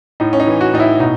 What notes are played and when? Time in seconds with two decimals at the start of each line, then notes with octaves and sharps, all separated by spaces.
0.20 A2 D#4
0.33 C#4
0.40 D#4
0.47 E3
0.61 F#4
0.73 A2 D#4
0.80 E4
1.00 B2 D#4